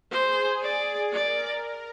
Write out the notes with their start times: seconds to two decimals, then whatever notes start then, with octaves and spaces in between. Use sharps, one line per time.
0.11 G#4 C5
0.62 D5
1.13 A#4 D5